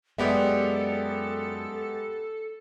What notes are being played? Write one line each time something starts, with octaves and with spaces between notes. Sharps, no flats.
F#2 G#3 B3 G4 A4 D5 E5